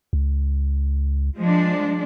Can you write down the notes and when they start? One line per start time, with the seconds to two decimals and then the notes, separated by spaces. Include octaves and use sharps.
0.13 C#2
1.39 F3 G#3 D4